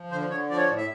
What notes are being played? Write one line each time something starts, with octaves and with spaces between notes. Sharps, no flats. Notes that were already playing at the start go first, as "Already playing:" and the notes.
Already playing: F3
D3 C5
D3 C#5
F3 D5
C#5
D5
A2
E5